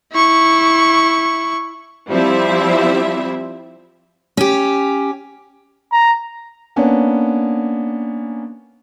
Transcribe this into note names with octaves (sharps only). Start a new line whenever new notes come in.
E4 C#6
F3 G3 C4 E4 E5
C#4 G4
A#5
A#3 B3 C#4 D4